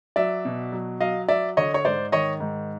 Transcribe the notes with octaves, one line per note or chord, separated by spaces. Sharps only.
F#3 D5 E5
B2
F#3
F#3 D#5 F5
F#3 D5 E5
D3 C#5 D#5
C#5
G#2 C5 D5
D#3 C#5 D#5
G#2